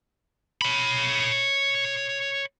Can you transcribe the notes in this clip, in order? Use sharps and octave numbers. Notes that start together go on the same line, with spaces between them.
C#5 B5